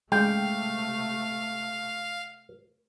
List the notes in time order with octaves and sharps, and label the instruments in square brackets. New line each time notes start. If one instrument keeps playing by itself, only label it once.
[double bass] C3 A3 [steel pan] G#3 [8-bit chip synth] F5 [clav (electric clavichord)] G5